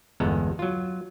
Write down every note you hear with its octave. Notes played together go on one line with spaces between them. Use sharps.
G1 E2 G#3 B3 A4 A#5
F#3 F4